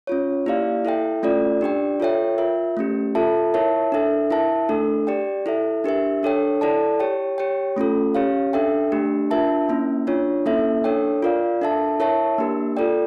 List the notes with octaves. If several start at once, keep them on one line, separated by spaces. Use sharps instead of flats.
C#4 F4 C#5
A#3 E4 G4 D5 F5
E4 A4 E5 G5
A3 C#4 F4 A4 D5
D4 G4 D5 G5
F4 A4 C#5 E5 G5
F4 A#4 E5
A3 C#4 G4
F4 A4 E5 A5
E4 A#4 C#5 E5 A5
D4 A4 E5
E4 A#4 E5 A5
A3 D4 A4
G4 D5 G5
E4 A4 E5
D4 G4 A#4 E5
D4 A4 C#5 G5
E4 A4 D5 A5
G4 C#5 G5
G4 C#5 G5
A3 C#4 F4 A4
C#4 G4 C#5 F5
D4 A4 E5 G5
A3 D4 G4
D4 F4 A#4 E5 A5
A#3 C#4 E4
D4 F4 C#5
A#3 C#4 E4 A4 E5
D4 A4 C#5 G5
F4 A#4 D5 F5
D4 A4 E5 A5
E4 A#4 C#5 E5 A5
A#3 D4 G4 A#4
F4 A4 D5 G5